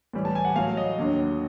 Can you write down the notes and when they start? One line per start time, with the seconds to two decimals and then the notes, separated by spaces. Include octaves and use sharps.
0.13 A2 E3 G3
0.25 A5
0.35 G#5
0.45 F#5
0.56 A2 F#3 F5
0.77 D#5
0.98 D#2 D3 F#3